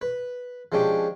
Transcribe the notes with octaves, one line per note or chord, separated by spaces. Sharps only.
B4
F3 G#3 C#4 D4 G4